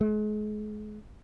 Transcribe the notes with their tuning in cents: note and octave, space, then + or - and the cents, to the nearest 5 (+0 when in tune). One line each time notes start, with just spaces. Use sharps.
G#3 +35